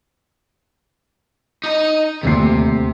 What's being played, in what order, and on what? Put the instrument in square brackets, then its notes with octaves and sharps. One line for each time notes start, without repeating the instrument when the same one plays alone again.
[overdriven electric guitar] D#4 D#5
[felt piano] D#1 D2 C7 [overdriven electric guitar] C3